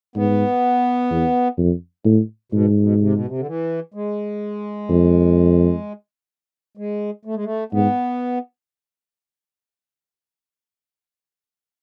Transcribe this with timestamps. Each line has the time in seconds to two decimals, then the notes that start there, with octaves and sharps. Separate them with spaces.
0.15 G#2 B3
1.10 E2
1.58 F2
2.05 A2
2.52 G#2 B2
2.80 B2
3.00 C3
3.13 B2
3.26 C3
3.38 D3
3.47 E3
3.94 G#3
4.89 F2
6.77 G#3
7.25 A3
7.35 G#3
7.44 A3
7.72 G#2 B3